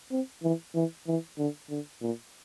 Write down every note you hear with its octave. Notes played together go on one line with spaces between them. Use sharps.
C4
E3
E3
E3
D3
D3
A#2